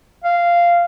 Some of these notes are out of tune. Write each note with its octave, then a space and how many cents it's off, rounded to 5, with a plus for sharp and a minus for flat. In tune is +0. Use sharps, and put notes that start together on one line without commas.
F5 -10